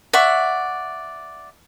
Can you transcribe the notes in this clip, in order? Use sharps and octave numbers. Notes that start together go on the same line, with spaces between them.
D5 E5 F#5 C#6